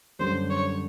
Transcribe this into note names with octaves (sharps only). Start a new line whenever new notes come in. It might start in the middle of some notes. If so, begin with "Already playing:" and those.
F#2 D3 G3 C5
C#5